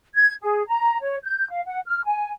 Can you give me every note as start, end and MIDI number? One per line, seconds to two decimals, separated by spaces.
0.15 0.33 92
0.42 0.63 68
0.67 0.98 82
1.01 1.17 73
1.23 1.49 91
1.50 1.60 77
1.67 1.79 78
1.86 2.02 89
2.04 2.31 80